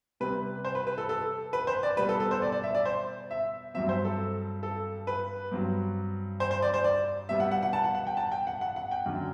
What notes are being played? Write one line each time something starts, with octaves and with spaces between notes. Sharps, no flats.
C3 G3 C4 B4
C5
B4
B4
A4
A4
B4
C5
D5
B2 G3 B3 B4
A4
A4
C5
D5
D5
E5
D5
C5
E5
G2 F#3 C4 E5
C5
A4
A4
B4
G2 F#3 C4
C5
C5
D5
C5
D5
B2 G3 B3 E5
F#5
F#5
F#5
A5
F#5
F#5
G5
A5
G5
F#5
F#5
F#5
G5
F#2 D3 F#3